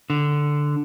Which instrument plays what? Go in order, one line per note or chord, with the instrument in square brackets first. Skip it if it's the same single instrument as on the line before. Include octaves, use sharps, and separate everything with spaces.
[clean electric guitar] D3